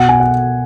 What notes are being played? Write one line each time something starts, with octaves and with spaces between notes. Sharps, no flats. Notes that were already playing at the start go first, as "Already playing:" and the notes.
Already playing: B2 F#5
G#5
F#5